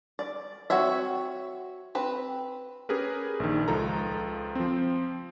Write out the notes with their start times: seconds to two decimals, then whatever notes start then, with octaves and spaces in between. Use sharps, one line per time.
0.19 D5
0.70 C4 F#4 C#5 E5
1.95 C4 B4
2.89 C#4 G4 G#4 A#4 B4
3.40 A#1 D#3
3.68 C#2 F3 A4 A#5
4.55 F3 C4